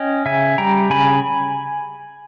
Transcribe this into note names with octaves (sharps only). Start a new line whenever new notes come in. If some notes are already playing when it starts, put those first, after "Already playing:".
Already playing: C#4 D#5 G5
C#3 E5 G#5
G3 G5 A#5
C#3 G#5 B5